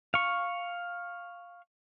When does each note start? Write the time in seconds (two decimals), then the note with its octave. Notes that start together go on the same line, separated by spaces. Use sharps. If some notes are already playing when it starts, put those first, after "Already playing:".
0.14 F5 C#6